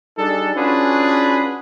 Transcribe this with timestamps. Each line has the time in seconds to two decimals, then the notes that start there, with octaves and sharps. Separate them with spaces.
0.17 G3 D4 D#4 G#4 A4
0.56 C#4 D4 F4 F#4 G#4 B4